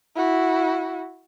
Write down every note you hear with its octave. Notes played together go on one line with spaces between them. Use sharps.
E4 F#4